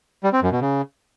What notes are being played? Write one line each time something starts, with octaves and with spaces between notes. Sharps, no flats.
G3
C4
F#2
B2
C#3